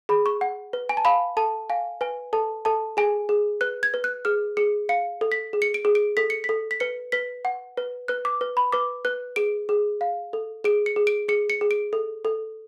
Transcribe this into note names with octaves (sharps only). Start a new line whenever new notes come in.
G#4 B5
C#6
F#5
B4
G#5
A5
F5 B5
A4 A5
F5 G#5
B4 G#5
A4 A5
A4 A5
G#4 G#5
G#4
B4 F#6
G#6
B4
F#6
G#4 F6
G#4 C#7
F5 C#7
A4
B6
G#4
C#7
D7
G#4
D7
A4 B6
C#7
B6
A4
B6
B4 C#7
B4 B6
F#5
B4
B4 F#6
D6
B4
B5
B4 D6
B4 F#6
G#4 D7
G#4
F5
A4
G#4 D7
C#7
G#4
D7
G#4 C#7
C#7
G#4
D7
A4
A4